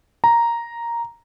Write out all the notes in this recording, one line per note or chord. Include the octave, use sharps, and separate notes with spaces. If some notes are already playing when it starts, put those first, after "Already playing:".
A#5